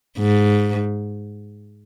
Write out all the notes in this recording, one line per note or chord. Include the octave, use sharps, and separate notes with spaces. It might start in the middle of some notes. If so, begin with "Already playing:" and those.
G#2